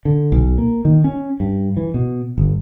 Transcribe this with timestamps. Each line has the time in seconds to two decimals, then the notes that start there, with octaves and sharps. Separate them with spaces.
0.05 D3
0.32 B1
0.58 A#3
0.85 D#3
1.04 C#4
1.40 G2
1.77 E3
1.94 B2
2.38 G1